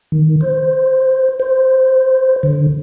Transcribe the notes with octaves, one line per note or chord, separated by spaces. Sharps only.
D#3
C5
C5
D3